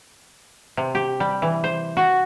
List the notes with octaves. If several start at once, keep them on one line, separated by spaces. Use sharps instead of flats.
C3
G4
G3
E3
C5
F#4